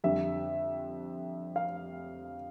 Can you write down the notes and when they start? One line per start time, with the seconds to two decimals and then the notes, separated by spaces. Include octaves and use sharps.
0.04 F2 D3 G3 E5
1.56 F5